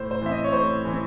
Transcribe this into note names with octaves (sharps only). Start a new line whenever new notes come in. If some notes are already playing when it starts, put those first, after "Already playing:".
Already playing: A2 C5
C5
E3 C4 E5
D#5
C#5
A2 C5
E3 C4